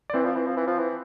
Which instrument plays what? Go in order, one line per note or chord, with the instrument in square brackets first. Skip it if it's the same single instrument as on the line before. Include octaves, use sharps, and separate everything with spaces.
[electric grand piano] D5
[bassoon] E3 [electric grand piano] C4 C5
[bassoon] F3
E3
F3
E3
F3
E3